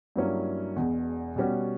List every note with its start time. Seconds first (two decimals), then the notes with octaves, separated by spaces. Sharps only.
0.16 G2 F#3 A#3 C#4 E4
0.76 E1 E2 B2
1.36 B2 G3 C#4 F#4